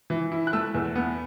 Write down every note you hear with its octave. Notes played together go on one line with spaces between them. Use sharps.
E3
E4
F#6
A3 E6
E2
B3